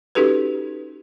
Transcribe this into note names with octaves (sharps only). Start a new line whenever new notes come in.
C#4 D#4 F#4 G4 A4 B4